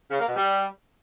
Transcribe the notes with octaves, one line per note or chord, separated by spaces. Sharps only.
C#3
A#3
B2
G3